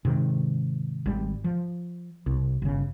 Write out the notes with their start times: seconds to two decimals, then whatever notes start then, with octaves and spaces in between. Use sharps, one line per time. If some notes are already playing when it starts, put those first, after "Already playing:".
0.05 G#2 C3 D#3
1.06 G#1 G3
1.44 F3
2.26 C2
2.62 G1 C#3